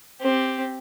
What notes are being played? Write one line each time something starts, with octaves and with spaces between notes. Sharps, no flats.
C4 G4